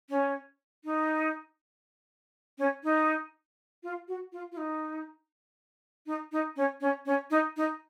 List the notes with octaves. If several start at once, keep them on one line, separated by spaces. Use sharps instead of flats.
C#4
D#4
C#4
D#4
F4
F#4
F4
F4
D#4
D#4
D#4
C#4
C#4
C#4
D#4
D#4